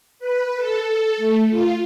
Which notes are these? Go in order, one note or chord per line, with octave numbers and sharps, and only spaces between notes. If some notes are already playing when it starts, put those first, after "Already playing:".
B4
A4
A3
F4